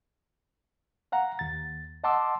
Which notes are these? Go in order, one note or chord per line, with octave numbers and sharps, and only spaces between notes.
F5 F#5 A#5
D#2 A6
D#5 F#5 A5 C6 D6 E6